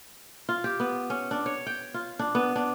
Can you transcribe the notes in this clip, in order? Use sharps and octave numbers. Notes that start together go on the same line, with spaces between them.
F4
G4
B3
C#4
D4
C#5
G5
F4
D4
B3
D4